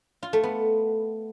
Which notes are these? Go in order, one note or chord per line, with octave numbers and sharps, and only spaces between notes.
F4
A3
B3